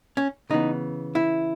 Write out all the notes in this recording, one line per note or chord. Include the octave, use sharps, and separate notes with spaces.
C#4
C#3 E3 B3 D#4
E4